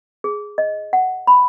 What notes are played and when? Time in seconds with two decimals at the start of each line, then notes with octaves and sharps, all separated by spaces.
0.24 G#4
0.58 D#5
0.93 F#5
1.27 B5